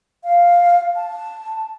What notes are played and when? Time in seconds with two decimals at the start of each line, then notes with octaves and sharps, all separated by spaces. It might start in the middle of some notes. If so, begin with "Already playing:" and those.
0.24 F5
0.96 A5